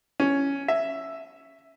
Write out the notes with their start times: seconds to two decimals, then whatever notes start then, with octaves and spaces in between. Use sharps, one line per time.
0.20 C#4
0.68 E5